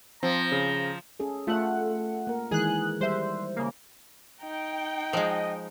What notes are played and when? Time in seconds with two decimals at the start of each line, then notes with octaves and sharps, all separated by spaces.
0.23 F3 C4 A#5
0.52 C#3
1.20 C#4 G#4 A4
1.47 A3 F4 E5 F#5
2.27 A#3 A#4
2.51 D#3 E3 G#3 G#4 F#6
3.01 G3 C5 E5
3.56 C#3 A#3
4.42 D#4 G5
5.13 F3 G#3 D#5